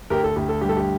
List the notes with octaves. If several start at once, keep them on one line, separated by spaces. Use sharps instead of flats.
D2 G4 A#4
A4
D2 G4
A4
G2 G4
A4
G4